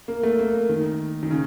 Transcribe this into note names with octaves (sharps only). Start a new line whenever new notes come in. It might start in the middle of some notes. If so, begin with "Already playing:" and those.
A#3
A3
A#3
D#3
D#3
C#3